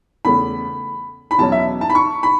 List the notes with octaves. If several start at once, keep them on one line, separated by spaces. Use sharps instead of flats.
E2 C#3 A3 B5
B5
E2 B2 F#3 C#4 A5
E5
A5
B5
C#6
B5